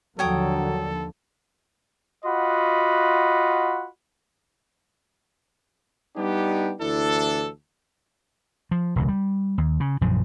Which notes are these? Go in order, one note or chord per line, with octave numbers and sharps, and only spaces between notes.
D#2 D3 F3 F#3 A4 C#5 G5 D#6
F4 F#4 D#5 F#5 B5
G3 B3 D4 D#4 G4
D2 E3 D4 E4 A4
F3
E1 C#2 B2
G3
D#2
C#3
A#1 F#2 C#3 F3